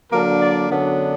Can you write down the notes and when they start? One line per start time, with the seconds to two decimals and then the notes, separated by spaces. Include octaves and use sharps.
0.12 D3 F#3 A#3 D4 A#4
0.41 D5
0.69 F#2 D3 F#3 B3 D4